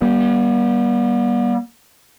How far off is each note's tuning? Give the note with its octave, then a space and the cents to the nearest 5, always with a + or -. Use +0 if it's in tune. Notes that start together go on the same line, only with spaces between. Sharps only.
G3 -10 B3 -45